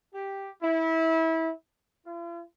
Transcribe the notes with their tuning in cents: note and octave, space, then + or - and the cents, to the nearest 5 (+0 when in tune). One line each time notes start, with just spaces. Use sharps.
G4 +0
E4 -25
F4 -45